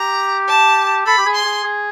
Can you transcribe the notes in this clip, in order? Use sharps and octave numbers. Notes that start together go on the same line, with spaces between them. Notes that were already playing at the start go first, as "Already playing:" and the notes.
Already playing: G4 A#5
A5
A4 B5
G4
G#4
C6
G#4
G#4